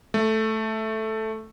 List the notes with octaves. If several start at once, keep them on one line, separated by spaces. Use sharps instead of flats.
A3